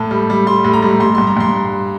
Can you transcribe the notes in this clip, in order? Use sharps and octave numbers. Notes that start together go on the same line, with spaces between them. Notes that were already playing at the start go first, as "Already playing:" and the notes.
Already playing: A2 A5
G3
G3
G3 C6
A2
A#5
G3
G2 C6
G2 C6
A#5
G2 C6